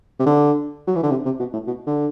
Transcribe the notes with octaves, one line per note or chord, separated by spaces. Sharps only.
C3
D3
F#3
E3
D3
C3
C3
B2
A2
B2
D3